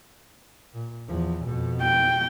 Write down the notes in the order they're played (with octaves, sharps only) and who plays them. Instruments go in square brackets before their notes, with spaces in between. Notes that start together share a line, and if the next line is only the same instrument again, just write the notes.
[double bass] A#2
E2 F3
F2 B2
[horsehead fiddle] G5